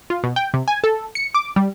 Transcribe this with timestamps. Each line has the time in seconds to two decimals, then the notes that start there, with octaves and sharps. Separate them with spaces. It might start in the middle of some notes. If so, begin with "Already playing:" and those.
0.10 F4
0.24 B2
0.36 G5
0.54 C3
0.68 G#5
0.84 A4
1.15 C#7
1.35 D6
1.56 G3